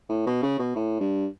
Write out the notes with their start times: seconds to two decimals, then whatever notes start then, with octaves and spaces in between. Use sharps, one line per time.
0.09 A2
0.26 B2
0.42 C#3
0.59 B2
0.75 A2
1.00 G2